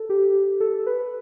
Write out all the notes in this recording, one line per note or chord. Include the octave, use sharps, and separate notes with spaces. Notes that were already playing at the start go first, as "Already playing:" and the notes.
Already playing: A4
G4
A4
B4